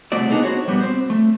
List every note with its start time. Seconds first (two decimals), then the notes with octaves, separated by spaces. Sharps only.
0.12 C2 C#3 A3 C4 F#4 D5
0.30 B3 D4 D#4 G#4 A4
0.43 F#4 C5 C#5
0.67 A#2 G3 B3
0.80 C4 C5
1.10 A3